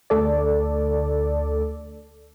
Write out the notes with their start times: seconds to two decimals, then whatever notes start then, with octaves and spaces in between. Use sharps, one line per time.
0.10 D2 A4 D5